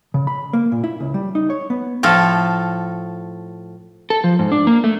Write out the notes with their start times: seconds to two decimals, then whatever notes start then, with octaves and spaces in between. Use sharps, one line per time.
0.14 C#3
0.27 B5
0.53 A#3
0.72 A#2
0.84 E4
1.00 C#2
1.14 G3
1.35 D#4
1.50 C#5
1.70 B3
2.03 A2 F3 A4
4.10 A4
4.24 F3
4.39 G#2
4.52 D4
4.67 A#3
4.84 A3